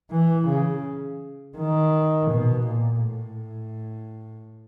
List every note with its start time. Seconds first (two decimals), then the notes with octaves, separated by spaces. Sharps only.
0.11 E3
0.48 C#3
1.58 D#3
2.31 B2
2.67 A#2
3.04 A2